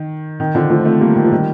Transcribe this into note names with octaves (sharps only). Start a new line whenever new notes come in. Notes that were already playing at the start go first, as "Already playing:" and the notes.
Already playing: D#3
D#3
D3 F3
F3 A3
A3 C4
G3 A#3
D#3
F3
D#3 G3